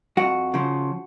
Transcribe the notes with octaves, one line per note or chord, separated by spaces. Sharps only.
F2 F#4
C#3 F3